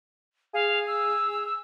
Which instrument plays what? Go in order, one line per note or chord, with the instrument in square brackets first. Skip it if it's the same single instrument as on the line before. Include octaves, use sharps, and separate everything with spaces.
[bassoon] G#4 [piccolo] F5
[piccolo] E6